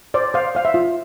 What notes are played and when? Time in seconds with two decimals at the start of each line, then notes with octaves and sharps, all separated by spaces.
0.14 C5 D5
0.34 C5 F5
0.55 C5 F5
0.65 E5
0.74 F4